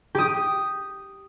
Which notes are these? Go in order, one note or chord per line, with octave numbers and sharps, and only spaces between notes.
G4 D#6